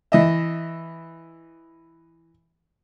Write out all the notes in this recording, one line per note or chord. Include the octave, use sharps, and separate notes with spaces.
E3 D#5 E5